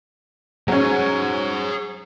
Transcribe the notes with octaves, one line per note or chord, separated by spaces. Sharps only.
F#3 C#4 G#4 C5